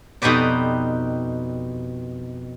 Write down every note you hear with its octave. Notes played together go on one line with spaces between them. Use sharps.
F2 B2 D#4 G4 B4 D5